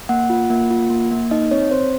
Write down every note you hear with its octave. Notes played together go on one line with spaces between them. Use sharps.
A#3 F#5
F4
A#3
F4
A#3
A#3
D#4 D#5
C4 C#5
C4 C5